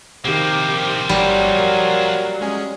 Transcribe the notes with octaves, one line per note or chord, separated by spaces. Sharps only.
C3 D#3 F3 A#3 G4
G1 F#3 G3 G5
A#4
G#3 C#4 G#4